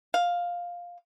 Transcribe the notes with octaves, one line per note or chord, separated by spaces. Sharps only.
F5